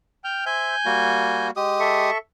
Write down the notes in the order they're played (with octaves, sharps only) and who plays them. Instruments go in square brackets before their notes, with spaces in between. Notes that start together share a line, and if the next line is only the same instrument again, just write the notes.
[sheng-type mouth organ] G5 F6 G6
[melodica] C5 E5 [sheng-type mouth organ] G#5 G6
[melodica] G3 A#3 F#4
G#3 G4 D#6
[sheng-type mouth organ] A4 E5 C#6